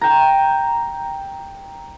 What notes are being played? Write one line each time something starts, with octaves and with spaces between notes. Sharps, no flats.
G5 A#5